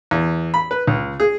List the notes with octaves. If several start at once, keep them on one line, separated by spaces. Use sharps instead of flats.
E2
B5
B4
C#2
G#4